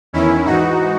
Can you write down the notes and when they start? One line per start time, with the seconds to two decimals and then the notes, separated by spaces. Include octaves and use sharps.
0.13 E2 D#3 C#4 E4
0.45 G#2 E3 D#4 F#4